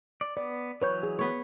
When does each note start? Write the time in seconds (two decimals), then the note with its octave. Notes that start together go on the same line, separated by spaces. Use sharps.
0.21 D5
0.37 B3 D5
0.82 E3 F#3 B4 C#5 G6
1.03 G#4
1.19 B3 C#5